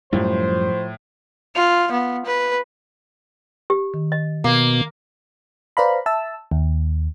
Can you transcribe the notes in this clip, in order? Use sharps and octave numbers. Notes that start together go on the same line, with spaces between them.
F#2 A2 F3 G3 C5
F4
B3
B4
G4
D#3
D#5
B2 A#3
B4 C5 D5 F5 A#5 B5
E5 A5 E6
D#2